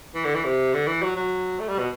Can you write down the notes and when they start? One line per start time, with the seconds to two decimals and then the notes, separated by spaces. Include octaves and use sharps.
0.15 E3
0.25 D3
0.35 E3
0.44 C3
0.74 D3
0.87 E3
1.03 F#3
1.16 F#3
1.60 A3
1.69 G3
1.79 B2